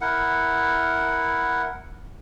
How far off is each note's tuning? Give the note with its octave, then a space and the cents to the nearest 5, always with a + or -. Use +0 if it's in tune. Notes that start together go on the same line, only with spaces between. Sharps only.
E4 +0 A#4 +0 F#5 +0